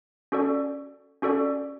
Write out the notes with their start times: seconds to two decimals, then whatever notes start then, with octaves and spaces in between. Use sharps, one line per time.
0.32 C#4 F#4 A4 D5
1.22 C#4 F#4 A4 D5